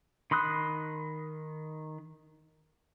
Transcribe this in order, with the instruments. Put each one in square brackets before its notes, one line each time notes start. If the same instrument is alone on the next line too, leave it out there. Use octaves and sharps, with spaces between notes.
[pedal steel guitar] D#3 B5 C6 D#6 F#6